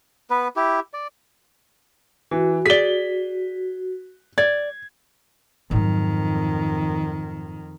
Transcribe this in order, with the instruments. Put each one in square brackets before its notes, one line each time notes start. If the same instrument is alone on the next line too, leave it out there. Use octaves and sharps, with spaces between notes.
[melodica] B3 B4
E4 G4
D5
[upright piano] E3 [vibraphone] F#4
[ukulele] G#4 D5 [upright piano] B6 G7
[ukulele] D5 [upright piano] G#6
[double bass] F2 D#3 [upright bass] G#2 F#3